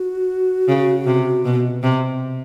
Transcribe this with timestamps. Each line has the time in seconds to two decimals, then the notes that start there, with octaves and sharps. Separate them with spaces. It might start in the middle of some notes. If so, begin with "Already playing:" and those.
Already playing: F#4
0.68 C#3
1.06 C3
1.45 B2
1.83 C3